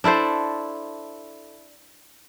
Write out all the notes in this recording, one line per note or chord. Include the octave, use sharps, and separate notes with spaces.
D4 E4 A4 C5